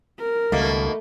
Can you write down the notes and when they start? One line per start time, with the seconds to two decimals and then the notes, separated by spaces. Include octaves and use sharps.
0.19 A#4
0.52 C#2 B2 D#3 G3 A3 A#3